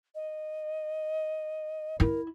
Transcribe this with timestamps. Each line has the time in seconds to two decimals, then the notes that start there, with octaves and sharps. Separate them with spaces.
0.15 D#5
2.00 E4 A#4